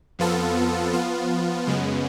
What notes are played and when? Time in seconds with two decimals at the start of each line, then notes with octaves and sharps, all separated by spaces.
0.19 F2 F3 B3 F4 A4
0.93 F3 B3 F4
1.67 F#2 C#3 G#3 B3